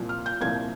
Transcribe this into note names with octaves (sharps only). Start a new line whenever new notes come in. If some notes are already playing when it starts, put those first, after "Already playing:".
Already playing: C2 A#2 F3
F6
G6
C2 A#2 F3 G#6